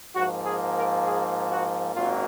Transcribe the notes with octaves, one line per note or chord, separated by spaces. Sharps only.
G#2 F3 A#3 F#4
G#4
A#4
G#4
F#4
G#1 F#2 D#3 F#3 A#3 F4